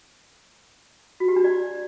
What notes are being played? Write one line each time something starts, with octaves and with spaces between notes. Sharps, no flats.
F#4
G4
D4
D5